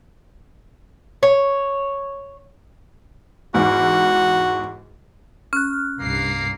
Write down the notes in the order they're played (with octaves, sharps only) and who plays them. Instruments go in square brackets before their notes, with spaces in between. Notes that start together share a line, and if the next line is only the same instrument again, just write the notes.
[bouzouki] C#5
[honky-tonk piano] E2 G#2 [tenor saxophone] F#4
[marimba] C#4 [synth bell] F6 F#6
[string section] C2 G2 C7 [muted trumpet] A#3